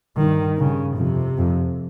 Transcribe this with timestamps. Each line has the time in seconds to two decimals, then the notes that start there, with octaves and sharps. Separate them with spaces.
0.17 G2 D#3
0.57 G2 C#3
0.97 F2 C3
1.37 F2